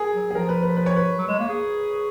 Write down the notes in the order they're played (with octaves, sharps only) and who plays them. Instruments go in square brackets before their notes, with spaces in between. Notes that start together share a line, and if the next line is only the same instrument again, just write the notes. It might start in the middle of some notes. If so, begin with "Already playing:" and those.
Already playing: [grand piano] G#4 A#4
[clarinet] F#3
[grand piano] G#4
[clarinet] F3 [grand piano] A#4
[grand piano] B4
B4
B4
C#5
B4
[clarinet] F#3
G#3
A#3
G#4